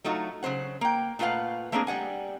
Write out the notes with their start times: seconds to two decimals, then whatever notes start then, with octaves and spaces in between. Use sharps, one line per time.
0.04 F#3 A3 D#4 F4 F#4
0.43 C#3 F#3 C5 F#5
0.81 A#3 G5
1.19 A#2 A3 F4 B4 F5 F#5
1.72 A3 A#3 C4 D4 F#4 G#4
1.87 G3 D5 F#5 G#5